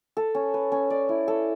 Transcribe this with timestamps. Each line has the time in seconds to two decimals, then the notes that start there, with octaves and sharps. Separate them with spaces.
0.17 A4
0.35 C#4
0.54 B4
0.72 C#4
0.90 D5
1.09 E4
1.28 A4